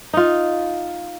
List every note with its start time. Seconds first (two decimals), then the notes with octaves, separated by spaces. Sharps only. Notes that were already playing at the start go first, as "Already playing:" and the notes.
0.13 D#4 F4